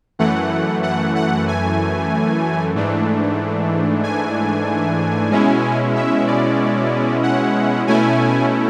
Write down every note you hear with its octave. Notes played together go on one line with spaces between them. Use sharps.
F#2 E3 A3 F#5
F#5
F#5
G#5
G#2 E3 A3 D4
G#5
B2 G#3 C#4 E4
E5
D5
F#5
B2 A3 C#4 E4 G#5